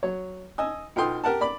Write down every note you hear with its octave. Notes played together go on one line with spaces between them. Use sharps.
F#3 C#5
D#5 G#5 E6
B1 F4 A4 G5 C6 D#6
G4 A#4 F#5 A5
D5 B5